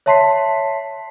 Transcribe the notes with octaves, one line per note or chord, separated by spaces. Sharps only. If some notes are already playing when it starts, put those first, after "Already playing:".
C#5 E5 A5 C6 B6 C7